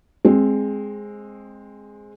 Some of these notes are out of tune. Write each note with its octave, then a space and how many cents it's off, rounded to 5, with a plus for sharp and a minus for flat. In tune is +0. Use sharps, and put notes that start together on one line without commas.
G#3 +0 C4 +15